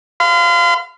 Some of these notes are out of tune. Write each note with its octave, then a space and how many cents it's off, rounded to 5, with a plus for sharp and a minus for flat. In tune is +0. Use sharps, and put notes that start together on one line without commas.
F5 -10 C6 -45